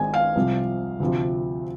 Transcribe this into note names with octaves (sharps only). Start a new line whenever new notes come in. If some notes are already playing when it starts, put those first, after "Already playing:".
Already playing: G#1 G#2 G#3 C4 G#5
F5
C2 C3 F3
D2 C3 F3